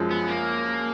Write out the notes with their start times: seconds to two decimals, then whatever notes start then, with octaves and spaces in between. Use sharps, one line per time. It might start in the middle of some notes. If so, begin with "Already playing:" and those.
Already playing: F#2 F3 G#3
0.11 B3
0.28 A#3